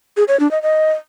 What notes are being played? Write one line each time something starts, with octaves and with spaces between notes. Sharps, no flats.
G#4
C#5
D4
D#5
D#5